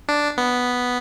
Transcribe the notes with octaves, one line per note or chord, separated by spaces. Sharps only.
D4
B3